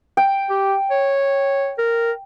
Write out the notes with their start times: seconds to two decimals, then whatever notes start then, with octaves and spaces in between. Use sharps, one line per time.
0.17 G5
0.50 G4
0.90 C#5
1.78 A#4